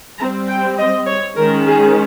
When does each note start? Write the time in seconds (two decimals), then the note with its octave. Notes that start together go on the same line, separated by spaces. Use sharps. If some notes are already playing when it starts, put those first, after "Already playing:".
0.19 G3 A#5
0.23 C4
0.49 G5
0.78 D#5
1.07 C#5
1.37 D#3 G#3 C#4 A#4
1.66 G#4